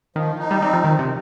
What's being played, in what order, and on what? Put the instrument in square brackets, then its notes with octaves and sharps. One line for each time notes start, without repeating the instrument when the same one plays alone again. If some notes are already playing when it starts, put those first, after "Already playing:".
[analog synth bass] D#3 [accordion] F3
[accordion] D#4
[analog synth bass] G3
[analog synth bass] G3 [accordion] C4
[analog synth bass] F3
[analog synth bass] D#3 [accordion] C4
[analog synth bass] C3